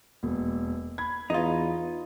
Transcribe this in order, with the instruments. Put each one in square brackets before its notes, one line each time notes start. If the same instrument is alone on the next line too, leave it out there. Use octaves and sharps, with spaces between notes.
[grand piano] E1 D#2
B5 G#6
[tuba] E2 [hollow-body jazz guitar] D#4 F4